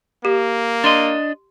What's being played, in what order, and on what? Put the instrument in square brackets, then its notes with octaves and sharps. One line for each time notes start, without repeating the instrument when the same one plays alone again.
[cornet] A#3 [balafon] G4
[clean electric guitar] D4 D#5 [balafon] C6